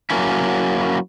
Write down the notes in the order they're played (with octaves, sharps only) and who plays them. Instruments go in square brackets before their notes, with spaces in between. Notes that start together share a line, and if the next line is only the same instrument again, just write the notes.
[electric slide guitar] F#3 A#3 C#4 E4